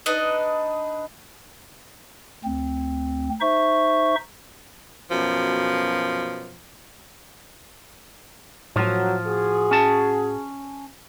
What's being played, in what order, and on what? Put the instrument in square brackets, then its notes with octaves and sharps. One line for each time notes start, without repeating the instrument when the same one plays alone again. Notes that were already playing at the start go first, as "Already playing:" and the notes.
[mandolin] D4 D#4 B4 D#5
[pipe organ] D2 C4
D#4 C5 E5 C#6
[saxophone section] F#2 B2 F3
[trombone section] F#2 F#3 [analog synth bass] A2 [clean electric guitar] F3
[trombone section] F#4 G#4
[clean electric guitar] C#4 A5